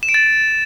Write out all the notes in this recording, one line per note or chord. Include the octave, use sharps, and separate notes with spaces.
E7
D7
A6